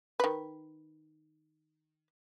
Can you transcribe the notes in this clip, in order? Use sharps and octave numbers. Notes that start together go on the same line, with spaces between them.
D#3 B4